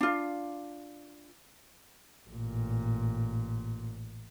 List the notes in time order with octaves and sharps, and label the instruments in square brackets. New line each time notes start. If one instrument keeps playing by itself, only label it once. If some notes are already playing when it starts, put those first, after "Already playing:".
[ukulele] D4 F4
[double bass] A1 A#2